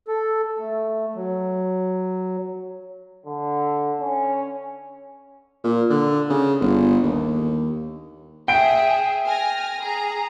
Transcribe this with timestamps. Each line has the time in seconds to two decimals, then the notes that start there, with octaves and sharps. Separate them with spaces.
0.08 A4
0.59 A3
1.15 F#3
3.26 D3
4.00 C#4
5.64 A#2
5.90 D3
6.30 C#3
6.61 G1
7.03 D#2
8.48 G#4 E5 G5 D7
9.24 G#5 F6 A#6
9.81 G#4 A#5